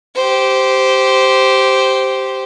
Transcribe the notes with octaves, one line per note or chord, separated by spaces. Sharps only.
G4 C5